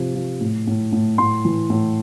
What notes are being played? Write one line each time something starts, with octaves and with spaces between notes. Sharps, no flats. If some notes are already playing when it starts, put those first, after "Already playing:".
Already playing: C3 F3
F3
A2
A2
A2
A2 C6
E3
A2